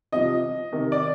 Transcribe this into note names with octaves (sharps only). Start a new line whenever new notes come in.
C3 F3 D#5
C3 D#3
D5